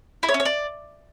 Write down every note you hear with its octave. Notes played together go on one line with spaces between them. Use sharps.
E4
C#5
C#4
C#5
D5